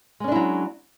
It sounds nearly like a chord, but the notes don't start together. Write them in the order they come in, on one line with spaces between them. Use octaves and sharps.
G#3 C#4 D4 E4 F#3